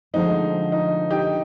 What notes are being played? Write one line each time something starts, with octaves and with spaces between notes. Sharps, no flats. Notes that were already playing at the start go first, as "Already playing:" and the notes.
D3 F3 G#3 C4 D#4
D#4
D#4 G4